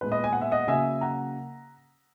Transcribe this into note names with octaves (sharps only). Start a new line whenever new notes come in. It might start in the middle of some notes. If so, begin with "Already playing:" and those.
A#2 G#3 B3 B4
B4 D#5
G#5
F#5
E5
D#5 F#5
C#3 F#3 A#3 E5 G#5
F#5 A#5